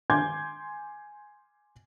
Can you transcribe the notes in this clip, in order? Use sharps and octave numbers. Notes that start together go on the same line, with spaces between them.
G#5 C6 D6 G6 G#6